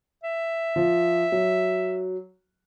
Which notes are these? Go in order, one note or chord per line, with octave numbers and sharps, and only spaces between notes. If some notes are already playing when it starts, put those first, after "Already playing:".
E5
F3
F#3